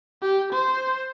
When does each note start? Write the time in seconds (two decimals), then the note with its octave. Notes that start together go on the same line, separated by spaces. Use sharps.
0.22 G4
0.53 C5